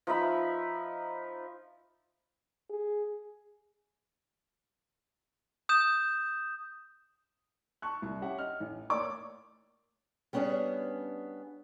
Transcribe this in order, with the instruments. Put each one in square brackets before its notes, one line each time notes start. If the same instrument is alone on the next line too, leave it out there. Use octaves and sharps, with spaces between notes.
[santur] F3 D#4 E5 B5
[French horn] G#4
[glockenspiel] D#6 G6 E7
[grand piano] A5 C#6 F#6
C2
C#4 G4 E5 F#5
D#5 F6
A1
A2 A#3 C#5 D5 D6
[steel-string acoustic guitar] G3 B3 C#4 D4 G#4